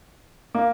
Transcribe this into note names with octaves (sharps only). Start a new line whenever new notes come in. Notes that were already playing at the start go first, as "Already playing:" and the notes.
A#3